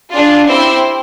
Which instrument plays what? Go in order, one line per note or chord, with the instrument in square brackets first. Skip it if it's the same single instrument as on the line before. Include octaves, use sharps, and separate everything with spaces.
[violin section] D4 F4 G#4
C4 E4 G4 C5 E5